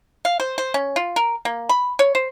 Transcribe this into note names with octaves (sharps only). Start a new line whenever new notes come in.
F5
C5
C5
C#4
F4
A#4
A#3
B5
C#5
C5